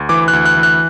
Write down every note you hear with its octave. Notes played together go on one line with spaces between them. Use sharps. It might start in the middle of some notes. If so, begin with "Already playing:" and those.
Already playing: D2
E3 D6
F#6
D2
F#6
E3
F#6